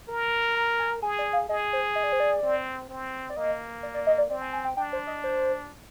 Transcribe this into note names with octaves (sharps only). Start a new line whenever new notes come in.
A#4
A#5
G#5
G#4 G#5
D5
F5
G#4 D#5
C5
D#5
D5
C5
D5
C4
C4
D5
A#3 D#5
D5
D5
D#5
D5
C4 D5
G#5
G#5
G5
D4 G5
C5
D#5
C5